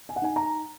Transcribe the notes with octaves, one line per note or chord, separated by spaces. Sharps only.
G#5
F#5
D#4 G#5
A#5